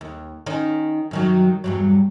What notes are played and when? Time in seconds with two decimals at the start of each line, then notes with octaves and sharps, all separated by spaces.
0.01 D#2
0.46 D#3 C#4 D#4
1.11 F#2 D#3 F#3
1.64 E2 G2 F#3